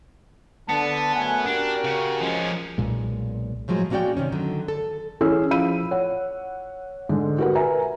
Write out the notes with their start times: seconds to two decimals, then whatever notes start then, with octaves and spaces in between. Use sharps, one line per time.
0.69 D3 B3 A5
1.15 F#2 A3 F#5 G#5
1.46 D4 F#4 G4 A#4
1.84 C#3
2.21 F3 G#3 C#4
2.78 B1 A#2 G#3
3.68 A2 F3 F#3 G#3
3.90 G#3 A#3 C#4 F#4 D5 G5
4.17 C3 D#3 C#4
4.32 D3 D#3 F#3
4.68 A4
5.21 E3 C#4 G#4 E6
5.51 F3 E4 F5 B5 E6 D#7
5.91 C#5 F#5
7.09 G#2 D3
7.38 F#4 G4 A#4 B4 F#5
7.55 A#4 B4 E5 G#5 A#5